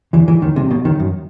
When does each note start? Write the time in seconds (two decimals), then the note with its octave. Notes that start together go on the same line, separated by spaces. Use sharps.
0.13 E2 E3
0.27 E2 E3
0.42 D#2 D#3
0.56 C2 C3
0.70 B1 B2
0.85 D#2 D#3
1.00 F#2